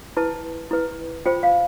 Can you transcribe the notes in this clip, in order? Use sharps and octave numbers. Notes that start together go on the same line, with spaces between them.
E4 B4 A5
E4 B4
F4 C5 G5
F5